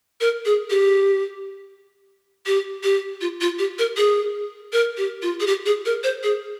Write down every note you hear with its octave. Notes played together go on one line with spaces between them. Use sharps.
A#4
G#4
G4
G4
G4
F4
F4
G4
A#4
G#4
A#4
G4
F4
G#4
G4
G#4
A#4
C5
G#4